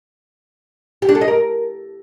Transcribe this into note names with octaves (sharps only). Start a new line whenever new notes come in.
G4
D4
A4
D#5
A#4